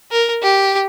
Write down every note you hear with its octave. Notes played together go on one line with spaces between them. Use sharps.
A#4
G4